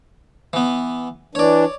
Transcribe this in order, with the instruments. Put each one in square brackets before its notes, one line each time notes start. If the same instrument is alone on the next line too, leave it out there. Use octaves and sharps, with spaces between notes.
[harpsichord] E3 B3
[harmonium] E3 D4 [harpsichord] C#5 D5